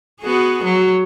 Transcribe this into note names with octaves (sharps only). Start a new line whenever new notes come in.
B3 F#4 G#4
F#3